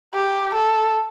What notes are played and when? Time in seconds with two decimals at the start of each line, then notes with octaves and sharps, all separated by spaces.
0.14 G4
0.55 A4